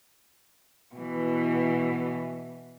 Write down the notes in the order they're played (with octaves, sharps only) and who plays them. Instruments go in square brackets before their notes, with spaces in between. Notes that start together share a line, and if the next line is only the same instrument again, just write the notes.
[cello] B2 E3